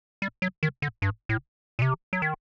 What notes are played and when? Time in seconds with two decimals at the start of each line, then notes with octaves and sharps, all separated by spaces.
0.22 G3
0.42 F#3
0.63 D#3
0.82 D3
1.02 G2
1.29 A2
1.79 A#2
1.82 C3
2.13 F#3
2.22 D#3